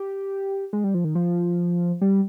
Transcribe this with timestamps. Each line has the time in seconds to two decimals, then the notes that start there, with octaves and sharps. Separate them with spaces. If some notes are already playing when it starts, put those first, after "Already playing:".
Already playing: G4
0.73 G#3
0.84 G3
0.94 F3
1.04 D#3
1.15 F3
2.01 G3